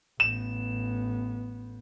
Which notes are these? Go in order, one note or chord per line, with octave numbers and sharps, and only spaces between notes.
A1 B3 E7